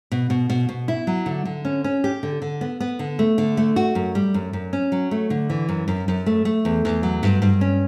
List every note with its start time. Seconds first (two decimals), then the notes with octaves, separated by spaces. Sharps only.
0.12 B2
0.30 B2
0.50 B2
0.69 B2
0.88 E4
1.07 F#3
1.26 D3
1.45 D3
1.65 C#4
1.84 C#4
2.04 G4
2.23 D3
2.42 D3
2.61 B3
2.80 B3
2.99 D3
3.19 A3
3.38 D3
3.57 A3
3.76 F#4
3.95 F#2
4.15 G3
4.34 F#2
4.53 F#2
4.73 C#4
4.92 F#3
5.11 A3
5.30 D3
5.50 E3
5.69 F#2
5.88 F#2
6.08 F#2
6.26 A3
6.45 A3
6.65 E2
6.85 E2
7.03 F#3
7.23 G2
7.42 G2
7.61 C#4